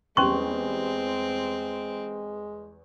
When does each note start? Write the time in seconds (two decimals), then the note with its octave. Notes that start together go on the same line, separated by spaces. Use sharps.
0.17 E2 G3 G#3 C4 C#4 C6 C#6